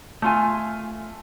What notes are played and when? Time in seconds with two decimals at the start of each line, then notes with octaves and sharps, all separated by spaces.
0.22 A3 F4 G#5